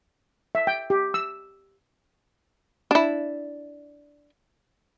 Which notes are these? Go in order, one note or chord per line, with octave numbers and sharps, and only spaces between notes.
E5
G5
G4
E6
D4 E4